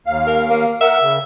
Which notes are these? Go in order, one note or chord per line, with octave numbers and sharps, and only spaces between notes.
D#2 F5
A#4
A#3
A#4 E5 F#5
C#3